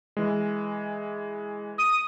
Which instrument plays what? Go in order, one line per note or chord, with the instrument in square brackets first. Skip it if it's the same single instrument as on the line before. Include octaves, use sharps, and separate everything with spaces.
[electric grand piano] E3 G#3
[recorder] D#6